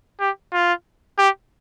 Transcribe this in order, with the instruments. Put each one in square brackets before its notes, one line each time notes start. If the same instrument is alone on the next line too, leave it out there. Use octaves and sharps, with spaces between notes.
[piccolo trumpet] G4
F4
G4